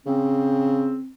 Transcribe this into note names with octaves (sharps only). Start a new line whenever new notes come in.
C#3 C4